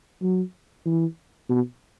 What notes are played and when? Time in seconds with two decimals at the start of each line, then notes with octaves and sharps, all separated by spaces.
0.22 F#3
0.86 E3
1.49 B2